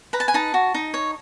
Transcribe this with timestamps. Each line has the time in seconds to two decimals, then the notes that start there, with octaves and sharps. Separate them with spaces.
0.13 B4 A#5
0.20 A5
0.28 G#5
0.34 D#4 A5
0.54 F#4
0.74 D#4
0.94 C#5